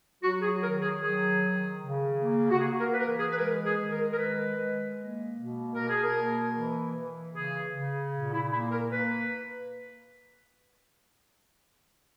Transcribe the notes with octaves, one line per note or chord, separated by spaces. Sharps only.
F#3 F#4
G#4
D#3 A#4
G#4
F#3 G#4
D#3
C#3
A#3
F#4
A#3 G#4
A#4
B4
E3 A#4
G#4
B4
G#3 A#4
G#4
D#3
A#4
A#4
G#3 B4
G#3
A#3
B2
B2 A#4
G#4
A#4
A#3
E3
E3
C#3 G#4
C#3
A#2
E4
A#3 E4
A#4
A#3 B4